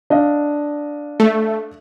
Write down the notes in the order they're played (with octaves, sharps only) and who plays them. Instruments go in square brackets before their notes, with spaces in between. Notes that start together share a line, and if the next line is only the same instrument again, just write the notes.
[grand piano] D4 D#5 F5
[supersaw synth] A3